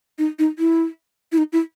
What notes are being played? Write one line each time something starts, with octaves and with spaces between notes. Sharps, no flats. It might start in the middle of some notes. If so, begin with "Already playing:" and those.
D#4
D#4
E4
E4
D#4
E4